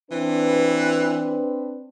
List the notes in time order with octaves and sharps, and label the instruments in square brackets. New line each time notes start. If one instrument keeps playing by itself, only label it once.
[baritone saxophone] E3 [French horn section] C4 D4 B4